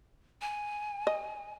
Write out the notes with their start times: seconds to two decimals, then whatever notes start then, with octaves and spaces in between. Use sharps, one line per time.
0.41 G#5
1.07 D#5